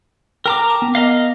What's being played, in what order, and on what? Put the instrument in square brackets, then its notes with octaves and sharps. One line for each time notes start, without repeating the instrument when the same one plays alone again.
[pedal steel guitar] A#4 A#5 D6 [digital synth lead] G5
[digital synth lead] A5
B3
[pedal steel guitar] A#4 D#5 F5